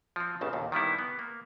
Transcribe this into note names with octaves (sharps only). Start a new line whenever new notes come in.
F3 C4
G1 C#2 C#3 A5
D#2 A#2
D#3 G3 B3 E4
B3
A#3